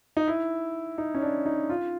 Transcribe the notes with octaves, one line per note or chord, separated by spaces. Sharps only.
D#4
E4
D#4
C#4
D4
D#4
F4